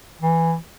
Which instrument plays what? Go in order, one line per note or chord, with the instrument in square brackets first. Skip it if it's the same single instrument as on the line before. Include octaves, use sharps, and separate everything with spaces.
[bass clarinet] E3